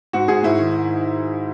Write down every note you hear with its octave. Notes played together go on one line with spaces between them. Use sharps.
G#2 F#4
G#2 G#4
G#2 E4
D#3